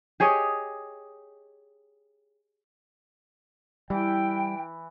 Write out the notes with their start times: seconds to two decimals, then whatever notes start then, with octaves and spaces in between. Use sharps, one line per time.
0.20 G4 G#4 C#5 D#5
3.90 E3 G3 G5